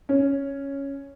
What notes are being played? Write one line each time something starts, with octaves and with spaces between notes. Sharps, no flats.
C#4